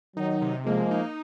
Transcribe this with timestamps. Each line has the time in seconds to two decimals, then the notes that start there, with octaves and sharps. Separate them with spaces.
0.17 D#3 F#3 D#4
0.42 C3
0.66 F3 G#3 A#3
0.91 D#4